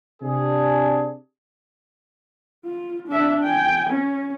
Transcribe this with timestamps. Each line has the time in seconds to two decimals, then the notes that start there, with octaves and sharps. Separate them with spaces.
0.22 C3 D4 G#4
2.65 F4
3.07 D4 E5
3.43 G5 G#5
3.90 C#4